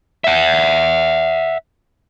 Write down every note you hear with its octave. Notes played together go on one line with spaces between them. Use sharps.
E5 F#5